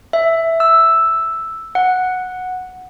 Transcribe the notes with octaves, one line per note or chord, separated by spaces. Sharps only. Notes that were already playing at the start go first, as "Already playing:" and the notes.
E5
E6
F#5